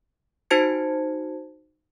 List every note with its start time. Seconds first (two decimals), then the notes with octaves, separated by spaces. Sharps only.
0.50 D#4 F#4 C5 A5 G#6 C#7